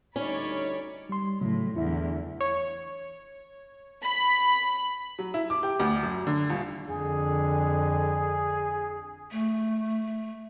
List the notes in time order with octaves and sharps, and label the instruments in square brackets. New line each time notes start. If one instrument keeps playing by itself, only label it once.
[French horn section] D2 G3 D#4 [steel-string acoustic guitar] C#4 [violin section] C#5 D5 B5
[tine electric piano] G3 C6
[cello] A2 [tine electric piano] C#3 F#3
[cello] E2 D3 [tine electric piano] E4 E5
[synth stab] C#5
[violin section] B5
[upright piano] F#3
E4
D6
G4
D2
F#2
D3
D#1
[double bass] F2 D3 [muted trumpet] G#4
[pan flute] A3